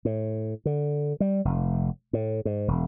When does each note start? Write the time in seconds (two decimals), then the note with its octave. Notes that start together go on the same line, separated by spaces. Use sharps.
0.05 A2
0.65 D3
1.20 G3
1.45 F1
2.13 A2
2.45 G#2
2.68 E1